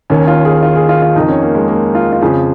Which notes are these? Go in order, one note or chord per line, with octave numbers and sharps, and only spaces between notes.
D#2 D#3 C#4
F4
G#4
F4
G#4
F4
F4
F2 D#3 D#4
C#4
A#3
G#3
A#3
F4
F4
F2 C#3 F3 G#4